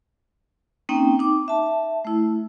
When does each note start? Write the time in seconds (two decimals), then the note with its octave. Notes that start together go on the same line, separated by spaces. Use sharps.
0.89 A#3 C4 C#4 D#4 G5
1.19 D#4 D6
1.48 E5 A5
2.05 A3 E4